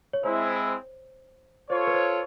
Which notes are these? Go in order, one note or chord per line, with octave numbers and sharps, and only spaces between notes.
C#5
G#3 C4 E4 C5
F4 A4 C5 C#5
B4
C5